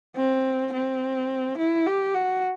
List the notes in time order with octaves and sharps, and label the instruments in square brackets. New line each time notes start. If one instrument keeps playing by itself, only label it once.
[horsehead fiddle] C4
C4
E4
G4
F#4